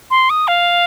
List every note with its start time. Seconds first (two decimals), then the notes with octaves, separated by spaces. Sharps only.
0.11 C6
0.30 D#6
0.48 F5